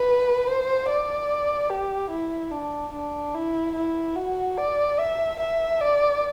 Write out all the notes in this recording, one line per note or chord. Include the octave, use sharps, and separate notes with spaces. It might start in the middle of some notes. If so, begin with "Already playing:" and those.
Already playing: B4
C5
D5
G4
E4
D4
D4
E4
E4
F#4
D5
E5
E5
D5